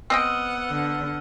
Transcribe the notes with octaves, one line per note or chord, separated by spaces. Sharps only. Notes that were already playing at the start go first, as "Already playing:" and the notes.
B3 C4 D#5 F#5 G5 E6 F6 D#7
D3